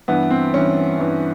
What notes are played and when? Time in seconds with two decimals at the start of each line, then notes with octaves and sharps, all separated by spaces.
0.08 G2 E3 B3
0.30 C4
0.54 G2 E3 C#4
0.99 G2 E3